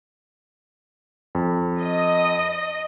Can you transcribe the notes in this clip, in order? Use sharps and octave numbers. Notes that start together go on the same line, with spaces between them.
F2
D#5